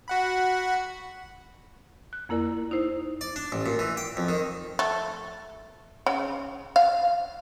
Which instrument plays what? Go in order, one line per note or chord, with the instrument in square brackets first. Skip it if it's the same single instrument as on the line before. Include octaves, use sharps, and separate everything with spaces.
[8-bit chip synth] F#4 F#5 B5
[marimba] F#6
F2 A#3 E4 A#4 D5
D#4 E4 C5
[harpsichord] D5
D4
A1
A#2
E3
G5
F2
D#3
[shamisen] A3
C#3
F5